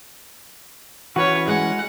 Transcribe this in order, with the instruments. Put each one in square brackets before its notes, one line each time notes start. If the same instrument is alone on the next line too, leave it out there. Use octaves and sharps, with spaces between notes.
[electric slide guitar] E3 C#4 [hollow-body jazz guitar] F#4 [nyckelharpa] B4 C#5
[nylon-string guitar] G#3 [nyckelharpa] F#5